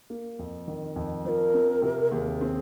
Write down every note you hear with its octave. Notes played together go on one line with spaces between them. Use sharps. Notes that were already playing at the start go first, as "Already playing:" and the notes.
A#3
F2
D#3
F2
F3 A#4 C5
C4
C3
D#2 G#4
C4